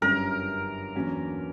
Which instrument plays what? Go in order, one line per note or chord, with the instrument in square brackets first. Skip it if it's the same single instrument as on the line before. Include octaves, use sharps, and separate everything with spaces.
[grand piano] G1 F#2 D3 G3 C#4 [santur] A#4
[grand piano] E2 D3 F#3 A#3 C#4